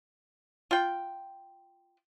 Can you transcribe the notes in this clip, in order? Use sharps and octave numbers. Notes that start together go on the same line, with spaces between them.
F4 G5